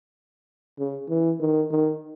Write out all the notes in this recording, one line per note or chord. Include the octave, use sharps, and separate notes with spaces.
C#3
E3
D#3
D#3